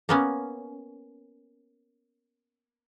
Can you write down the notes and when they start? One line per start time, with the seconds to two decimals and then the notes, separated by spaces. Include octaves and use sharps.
0.09 A#3 B3 C#4